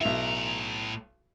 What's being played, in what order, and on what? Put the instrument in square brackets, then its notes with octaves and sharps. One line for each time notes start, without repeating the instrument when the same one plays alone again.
[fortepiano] B1 E4 [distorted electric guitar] A2 A#5